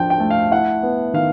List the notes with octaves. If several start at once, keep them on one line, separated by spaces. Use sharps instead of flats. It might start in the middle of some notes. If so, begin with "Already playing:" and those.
Already playing: F3 D4 F4 G5
G5
A3
F5
E4 F#5
B3
D#3 F5